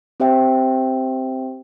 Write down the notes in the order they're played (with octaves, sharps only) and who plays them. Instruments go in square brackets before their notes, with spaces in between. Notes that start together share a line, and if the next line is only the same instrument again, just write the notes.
[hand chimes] C4 G4 C5 E5 G5